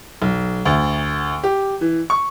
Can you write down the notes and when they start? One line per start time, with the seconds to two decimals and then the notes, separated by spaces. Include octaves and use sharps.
0.22 B1
0.65 D2
1.44 G4
1.81 E3
2.10 C#6